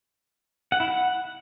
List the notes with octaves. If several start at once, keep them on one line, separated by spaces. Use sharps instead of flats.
F#5
E4
F#5